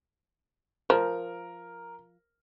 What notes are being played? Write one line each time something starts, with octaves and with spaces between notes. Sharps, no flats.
F3 A#4